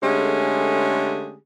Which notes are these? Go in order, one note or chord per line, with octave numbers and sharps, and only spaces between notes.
D3 G#3 A3 C#4 G4 G#4